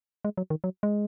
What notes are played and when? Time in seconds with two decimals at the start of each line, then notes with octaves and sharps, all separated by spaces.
0.25 G#3
0.38 F#3
0.50 D#3
0.64 F#3
0.83 G#3